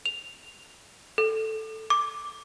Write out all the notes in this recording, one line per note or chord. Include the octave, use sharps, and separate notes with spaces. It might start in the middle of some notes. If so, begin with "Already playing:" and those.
F7
A4
D6